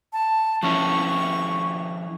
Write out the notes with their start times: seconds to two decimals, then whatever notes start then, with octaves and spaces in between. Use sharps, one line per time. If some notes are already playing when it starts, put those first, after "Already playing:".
0.13 A5
0.63 F3 C#4 E4 C#6